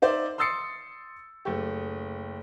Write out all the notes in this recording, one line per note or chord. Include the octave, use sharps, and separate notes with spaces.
D#4 C5 D5 E5
C6 D#6 E6 A6 C7 C#7
F#1 A3 G4